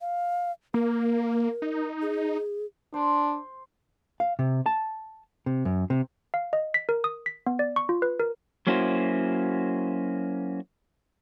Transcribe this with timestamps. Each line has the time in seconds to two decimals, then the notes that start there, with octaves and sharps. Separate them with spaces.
0.01 F5
0.74 A#3 A#4
1.62 D#4
2.02 G#4
2.94 D4 C5
4.20 F5
4.39 C3
4.66 A5
5.46 C3
5.65 F#2
5.90 C3
6.34 F5
6.53 D#5
6.74 B6
6.89 A#4
7.04 D#6
7.26 B6
7.46 B3
7.59 D5
7.76 C#6
7.89 F4
8.02 B4
8.20 A#4
8.67 F#3 A#3 C#4 E4 F#4 C5